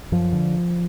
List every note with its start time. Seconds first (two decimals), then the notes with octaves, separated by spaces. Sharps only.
0.12 F#2 F3
0.33 D3